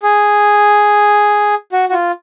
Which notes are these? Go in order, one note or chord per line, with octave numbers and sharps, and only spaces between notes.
G#4
F#4
F#4
F4